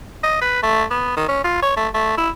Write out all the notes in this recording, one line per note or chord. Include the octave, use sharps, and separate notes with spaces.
D#5
B4
A3
B3
D#3
C#4
F4
C#5
A3
A3
E4